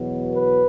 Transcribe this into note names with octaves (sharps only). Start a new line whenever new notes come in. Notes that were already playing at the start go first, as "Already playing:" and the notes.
Already playing: E2 B2 F#3 B3
B4